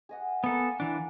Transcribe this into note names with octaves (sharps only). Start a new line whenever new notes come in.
G#4 D#5 F#5
A#3 B3 A4 G#5 E6
E3 D4